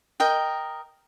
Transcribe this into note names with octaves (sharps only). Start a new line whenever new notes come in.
A#4 D#5 G5